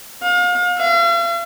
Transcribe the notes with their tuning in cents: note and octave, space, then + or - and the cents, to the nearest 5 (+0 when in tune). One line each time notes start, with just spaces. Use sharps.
F5 +35
F5 -45